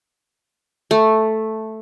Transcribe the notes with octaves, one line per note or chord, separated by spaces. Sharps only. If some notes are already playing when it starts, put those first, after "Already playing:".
A3